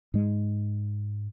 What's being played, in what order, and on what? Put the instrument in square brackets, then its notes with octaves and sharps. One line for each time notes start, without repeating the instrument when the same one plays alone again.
[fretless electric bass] G#2 G#3